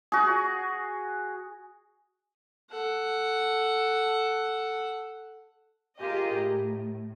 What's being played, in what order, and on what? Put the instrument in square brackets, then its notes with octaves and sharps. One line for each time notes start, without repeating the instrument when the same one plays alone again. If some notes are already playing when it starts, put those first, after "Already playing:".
[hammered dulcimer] F#4 G#4
[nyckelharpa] A4 F#5
[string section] F4 G4 G#4 A#4 D#5
A2